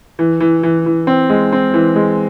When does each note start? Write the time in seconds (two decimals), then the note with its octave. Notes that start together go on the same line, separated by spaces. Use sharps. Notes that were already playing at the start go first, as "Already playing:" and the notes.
0.19 E3
0.40 E3
0.63 E3
0.86 E3
1.07 C4
1.30 G#3
1.53 C4
1.74 E3
1.96 G#3